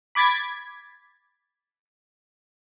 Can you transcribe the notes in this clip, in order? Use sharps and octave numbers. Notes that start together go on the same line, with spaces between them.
B5 D6 G#6 A6 B6